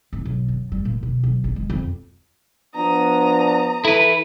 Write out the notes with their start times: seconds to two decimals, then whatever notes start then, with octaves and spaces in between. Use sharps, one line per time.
0.13 G#1
0.25 B1
0.48 F#2
0.72 G3
0.85 A#2
1.03 B2
1.23 B1
1.44 A#1
1.56 G#3
1.70 F2
2.75 F3 B3 D4 A#5 D#6
3.85 E4 A4 B4